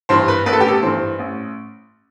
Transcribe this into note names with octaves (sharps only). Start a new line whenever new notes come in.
G2 E3 C5
B4
A1 B4
A4
G4
A4
G2 E3 C5
A1